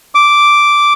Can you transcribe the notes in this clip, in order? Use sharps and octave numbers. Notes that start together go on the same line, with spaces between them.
D6